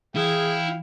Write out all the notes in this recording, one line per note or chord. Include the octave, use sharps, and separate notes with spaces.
E3 E4 G#4 F5 G5